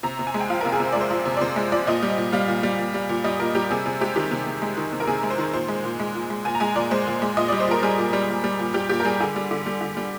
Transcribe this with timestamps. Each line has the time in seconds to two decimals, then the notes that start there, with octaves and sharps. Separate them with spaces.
0.03 C3 A#5
0.19 C3
0.27 G#5
0.34 G#3
0.40 G5
0.50 F3 F5
0.61 C3 A#4
0.72 G#4
0.80 C3 C5
0.92 D5
0.96 G#3
1.01 C5
1.11 F3
1.25 C3
1.37 D5
1.41 C3 C5
1.56 G#3
1.72 F3 D5
1.87 A#2 D#5
2.03 G3
2.18 A#2
2.32 G3 F5
2.48 A#2
2.63 G3
2.79 A#2
2.94 G3
3.09 A#2
3.24 G3 D#5
3.40 A#2 A#4
3.55 G3 G4
3.70 C3 G#4
3.85 C3 G#4
4.01 G#3 G4
4.16 D#3 G4
4.31 C3
4.47 C3
4.62 G#3
4.77 D#3
4.93 C3
5.00 A#4
5.07 C3 G#4
5.23 G#3
5.31 C5
5.38 D#3
5.53 A#2 C5
5.68 G#3
5.84 A#2
5.99 G#3
6.14 A#2
6.30 G#3
6.45 A#2 G#5
6.55 A#5
6.60 G#3 G#5
6.76 A#2 D5
6.91 G#3 C5
7.07 A#2
7.22 G#3
7.37 A#2 D#5
7.48 G3 D5
7.60 C5
7.67 A#2 A#4
7.83 G3 G#4
7.98 A#2
8.13 G3
8.29 A#2
8.44 G3
8.59 A#2
8.74 G3 G4
8.89 A#2 G4
9.00 A#4
9.05 G3 G#4
9.20 D3 G#4
9.36 G3
9.51 D3
9.66 G3
9.81 D3
9.97 G3